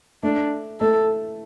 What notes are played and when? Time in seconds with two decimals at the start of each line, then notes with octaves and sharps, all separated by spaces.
0.23 A3 D4
0.80 A3 A4